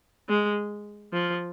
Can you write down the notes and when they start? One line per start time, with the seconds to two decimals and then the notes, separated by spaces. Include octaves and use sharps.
0.29 G#3
1.13 F3